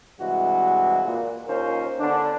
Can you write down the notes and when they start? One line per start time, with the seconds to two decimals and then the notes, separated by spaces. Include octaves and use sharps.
0.20 G2 C3 E3 G#3 F#4
1.06 A#2
1.48 D#2 C#4 F4 A#4 C5
2.00 D3 B3 D4